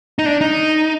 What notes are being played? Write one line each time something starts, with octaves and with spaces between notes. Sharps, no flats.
D#4
D4
D#4